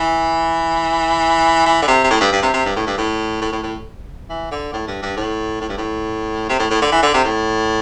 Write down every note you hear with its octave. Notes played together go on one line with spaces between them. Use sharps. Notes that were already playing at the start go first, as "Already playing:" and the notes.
Already playing: E3
E3
D3
C3
C3
A2
G2
G2
C3
C3
G2
A2
G2
A2
A2
A2
A2
E3
D3
A2
G2
G2
A2
A2
G2
A2
C3
A2
A2
D3
E3
D3
C3
A2